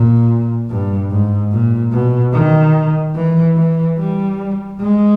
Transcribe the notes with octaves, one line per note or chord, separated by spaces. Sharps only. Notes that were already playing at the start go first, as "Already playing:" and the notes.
Already playing: A#2
G2
G#2
A#2
B2
D#3
E3
E3
G3
G#3